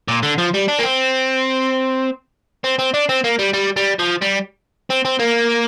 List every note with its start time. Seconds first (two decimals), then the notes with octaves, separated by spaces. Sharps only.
0.08 A#2
0.23 D3
0.38 F3
0.54 G3
0.68 D4
0.79 A#3
0.83 C4
2.64 C4
2.79 C4
2.94 D4
3.09 C4
3.24 A#3
3.39 G3
3.54 G3
3.77 G3
3.99 F3
4.22 G3
4.90 C4
5.05 C4
5.20 A#3